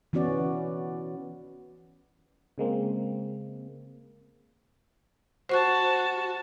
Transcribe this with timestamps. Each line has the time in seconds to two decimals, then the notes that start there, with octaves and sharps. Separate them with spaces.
0.13 E3 B3 C#4 F#4 D5
2.58 C#3 G#3 A#3 C4
5.49 F#4 C5 A5 C#6 F#6